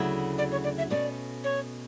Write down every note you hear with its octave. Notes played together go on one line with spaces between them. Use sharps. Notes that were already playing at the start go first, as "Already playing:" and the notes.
Already playing: D2 C#3 F#3 A3 E4
D5
C#5
D5
E5
B2 A3 C#4 D5
C#5